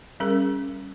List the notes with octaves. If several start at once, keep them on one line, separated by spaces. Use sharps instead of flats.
G3 C#4 G#4 A#4